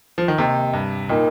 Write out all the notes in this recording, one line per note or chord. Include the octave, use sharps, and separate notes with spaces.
F3
D#3
C3 A#3 G4 D#5 G5
G2
A#2 A#3 D#4 A#4 D#5 G5